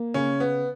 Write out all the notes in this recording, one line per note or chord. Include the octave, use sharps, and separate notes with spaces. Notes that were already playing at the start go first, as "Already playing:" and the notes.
Already playing: A#3
C#3 C#4
B3